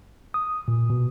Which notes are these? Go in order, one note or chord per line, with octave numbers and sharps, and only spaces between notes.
D#6
A#2
B2